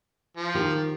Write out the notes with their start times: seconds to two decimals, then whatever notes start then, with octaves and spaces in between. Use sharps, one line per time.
0.37 F3
0.54 D#3 G4